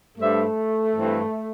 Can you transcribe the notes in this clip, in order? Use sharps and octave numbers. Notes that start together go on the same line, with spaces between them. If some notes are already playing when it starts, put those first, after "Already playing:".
G2 G3 A3 D4 C5 E5
G2 E3 C4